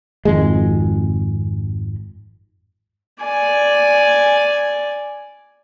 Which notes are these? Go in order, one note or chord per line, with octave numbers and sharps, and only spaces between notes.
G#1 F2 G#3
D5 G#5